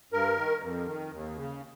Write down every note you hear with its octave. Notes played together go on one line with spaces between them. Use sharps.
G2 A#4
D#3
F2
D#3
D#2
C#3